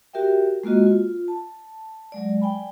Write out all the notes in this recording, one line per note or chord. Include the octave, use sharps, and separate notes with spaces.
F#4 G4 A#4 E5 G5
G#3 A#3 F4 F#4 D#5
F4
A5
F#3 G#3 D5
D5 G5 G#5 B5